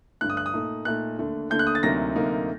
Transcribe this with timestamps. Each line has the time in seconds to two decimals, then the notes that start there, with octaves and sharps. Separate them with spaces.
0.21 G2 D3 A3 F#6
0.30 D#6
0.37 F#6
0.46 D#6
0.54 A#2 A3 D#4
0.85 A#2 A3 D#4 F#6
1.19 D#2 D3 A3
1.50 D#2 D3 A3 G6
1.59 F#6
1.67 D#6
1.75 A6
1.83 D2 C3 F#3 A#3 D#4 A#6
2.16 D2 C3 F#3 A#3 D#4